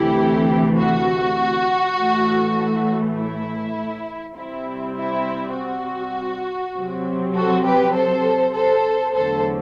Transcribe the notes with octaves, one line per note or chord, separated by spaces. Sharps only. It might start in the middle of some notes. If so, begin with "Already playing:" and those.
Already playing: D2 C3 E3 A3 E4 G4
F#4
A2 E3 A3
E4
C3 G3 C4 E4
E4
F#4
C3 F#3 C4
F#4 A4
G4 B4
A4 C5
A4 C5
E2 D3 F#3 A3 A4 C5